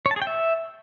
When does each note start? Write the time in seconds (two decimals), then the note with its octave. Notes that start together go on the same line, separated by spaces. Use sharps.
0.06 C#5
0.11 A5
0.16 G#4
0.22 G5
0.27 E5